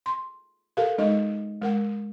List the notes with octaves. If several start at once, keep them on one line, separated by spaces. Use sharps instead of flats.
C6
G4 A4 A#4 F5
G#3 D#4 D#5
G#3 A#4 F#5